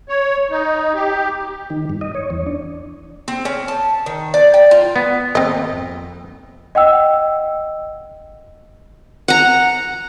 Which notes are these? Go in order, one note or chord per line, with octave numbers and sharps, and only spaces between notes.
C#5
D#4
G4
D#3
G2
D#5
C#5
E2
D4
C4
C#4
A5
D#3
D5
G5
F4
B3
G#1 D#2 A#3 C4 D#5
F2
D#5 F#5 G5 E6
F#5 A#5